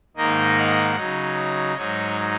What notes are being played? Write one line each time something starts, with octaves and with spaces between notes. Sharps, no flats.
G#2 D#3 A#3 D#4 D#5
F#5
C#3 F#3 D#4
D#5
G#2 F#3 D#4 C#5